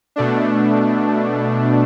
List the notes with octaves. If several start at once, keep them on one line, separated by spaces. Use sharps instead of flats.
B2 A3 D4